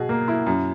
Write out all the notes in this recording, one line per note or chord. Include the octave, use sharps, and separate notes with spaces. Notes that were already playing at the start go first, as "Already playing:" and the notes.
Already playing: B2 G#4
A#3
E4
F#2